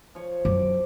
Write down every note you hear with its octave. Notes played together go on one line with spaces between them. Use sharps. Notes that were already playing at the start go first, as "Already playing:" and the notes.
F3 C#5
F#2 D6